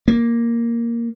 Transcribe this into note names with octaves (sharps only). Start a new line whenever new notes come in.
A#3